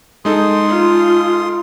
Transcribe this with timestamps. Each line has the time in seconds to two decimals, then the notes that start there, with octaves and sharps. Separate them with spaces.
0.25 G#3 D#4 A4 C6 D#6
0.68 F4